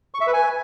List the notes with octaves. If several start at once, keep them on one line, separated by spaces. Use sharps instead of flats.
C#6
E5
B4
G#5